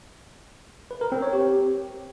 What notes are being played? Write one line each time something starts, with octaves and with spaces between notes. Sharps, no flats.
B4
A#4
C4
C#5
G4